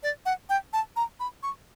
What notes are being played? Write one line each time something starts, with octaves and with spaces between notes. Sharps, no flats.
D5
F#5
G5
A5
A#5
B5
C#6